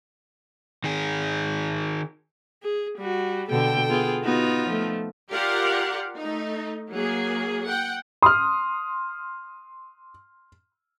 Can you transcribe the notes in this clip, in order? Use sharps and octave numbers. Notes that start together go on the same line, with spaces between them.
D#3 G#4
G#4
G3 F#4
B2 D3 A4 G5
B3 F4 G#4
B3 D#4 F4 F#4
F3 A3
F4 G4 A#4 D5 F5 F#5
A3 D#4
F#3 A#3 G#4
F#5 G5
C6 D#6 F6